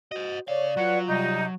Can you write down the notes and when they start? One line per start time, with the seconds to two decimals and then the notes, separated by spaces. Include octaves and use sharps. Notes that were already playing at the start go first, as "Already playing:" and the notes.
0.12 F#4 C5 D#5
0.48 C#3 C#5 D5 F5
0.77 F#3 F4 B4 F#5
1.08 C3 G3 D#4